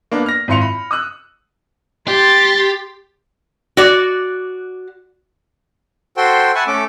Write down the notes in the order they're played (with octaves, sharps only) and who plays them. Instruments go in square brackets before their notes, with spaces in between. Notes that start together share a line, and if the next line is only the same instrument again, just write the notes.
[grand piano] A#3 B3 D4
F6 A#6
G#1 E4 F4 C6 C#7 F7
B5
D#6 E6 F#6
[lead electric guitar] G4 [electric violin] C6 A6
[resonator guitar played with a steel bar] F#4 D5
[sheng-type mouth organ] F#4 A4 C5 G5 C6
E5 F#5 G#5 A5 B5 C#6
A3 C#4 A4 D6